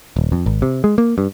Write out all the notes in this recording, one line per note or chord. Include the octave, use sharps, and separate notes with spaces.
D#1
F2
G#1
C3
G#3
A#3
G2